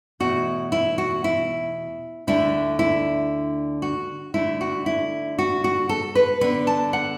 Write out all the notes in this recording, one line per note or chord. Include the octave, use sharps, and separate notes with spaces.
E2 B2 A3 E4 F#4
E4
F#4
E4
D2 D3 A3 D4 E4
E4
F#4
D3 A3 D4 E4
F#4
E4
F#4
F#4
A4
B4
D3 B3 D4 B4
A5
F#5